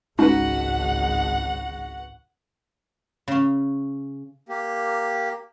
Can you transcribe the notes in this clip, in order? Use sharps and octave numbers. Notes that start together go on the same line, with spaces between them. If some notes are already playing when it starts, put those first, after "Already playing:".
G#1 C#2 G#3 C#4 D#4 F#4 B4 F#5
C#3 C#4
A#3 G4